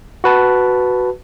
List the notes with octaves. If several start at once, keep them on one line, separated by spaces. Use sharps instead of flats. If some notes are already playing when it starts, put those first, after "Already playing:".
F#4 B4 A5